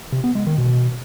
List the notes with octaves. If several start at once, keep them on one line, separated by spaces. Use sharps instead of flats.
C3
B3
G#3
D#3
B2